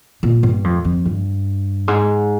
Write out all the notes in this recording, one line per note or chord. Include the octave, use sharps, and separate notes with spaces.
A#2
G2
F2
F2
G2
G#2